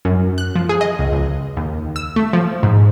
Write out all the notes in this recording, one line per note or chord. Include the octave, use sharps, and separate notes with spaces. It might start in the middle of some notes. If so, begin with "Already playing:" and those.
F#2
F#6
F3
G#4
D#5
C#2
C#2
D#2
E6
A3
F3
G#2